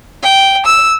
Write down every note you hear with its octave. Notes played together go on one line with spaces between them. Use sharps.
G5
E6